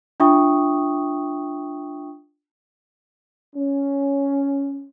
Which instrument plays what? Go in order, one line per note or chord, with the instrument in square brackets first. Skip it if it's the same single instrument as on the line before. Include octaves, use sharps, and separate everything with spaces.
[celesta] D4 F4 E5 G5 C#6 D#6
[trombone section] C#4